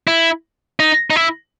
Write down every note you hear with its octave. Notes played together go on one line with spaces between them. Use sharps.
E4
D#4
D#4
E4